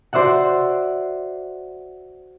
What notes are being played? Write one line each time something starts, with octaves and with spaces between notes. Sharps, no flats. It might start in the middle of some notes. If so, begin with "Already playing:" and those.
F#4 C5 D5 E5 F#5